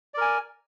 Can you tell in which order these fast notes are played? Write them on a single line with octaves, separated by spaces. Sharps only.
D5 A#4 G#5